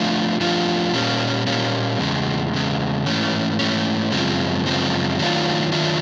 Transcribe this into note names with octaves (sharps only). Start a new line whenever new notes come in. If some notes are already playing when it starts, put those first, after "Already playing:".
Already playing: F3 A3 D4 F4
F3 A3 D4 F4
A#2 G3 A#3 C#4
A#2 G3 A#3 C#4
E2 C#3 G#3
E2 C#3 G#3
G#2 E3 A3 C#4
G#2 E3 A3 C#4
F#2 C#3 F3 G#3 C4
F#2 C#3 F3 G#3 C4
D#3 F#3 A3 D4 F4
D#3 F#3 A3 D4 F4